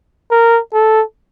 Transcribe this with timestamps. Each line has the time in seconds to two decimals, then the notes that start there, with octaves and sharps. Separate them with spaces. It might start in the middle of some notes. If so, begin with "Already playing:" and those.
0.31 A#4
0.74 A4